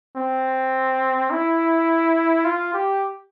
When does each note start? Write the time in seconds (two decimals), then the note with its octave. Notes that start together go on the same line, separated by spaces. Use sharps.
0.17 C4
1.31 E4
2.45 F4
2.74 G4